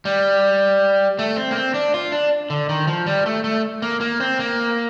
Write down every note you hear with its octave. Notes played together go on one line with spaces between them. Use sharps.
G3
A3
C4
A#3
C4
D4
F4
D4
D3
D#3
F3
G3
A3
A3
A#3
A#3
C4
A#3